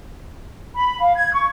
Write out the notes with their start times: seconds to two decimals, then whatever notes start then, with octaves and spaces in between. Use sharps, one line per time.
0.75 B5
1.00 F5
1.15 G#6
1.34 C#6